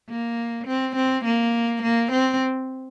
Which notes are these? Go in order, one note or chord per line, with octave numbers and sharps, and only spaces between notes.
A#3
C4
C4
A#3
A#3
C4